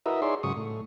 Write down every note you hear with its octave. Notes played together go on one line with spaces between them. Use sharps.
E4 F#4 A#4 B4 D#5 E5
D#4 G#4 C#5 D5 E5 C6
G#2 C#3 F#3 C#6 D#6
A2